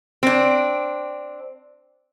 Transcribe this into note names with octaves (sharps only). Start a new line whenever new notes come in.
C4 D4